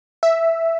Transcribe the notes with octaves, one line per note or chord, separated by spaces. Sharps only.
E5